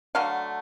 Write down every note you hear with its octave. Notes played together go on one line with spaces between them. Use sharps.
D3 F#3 A3 F5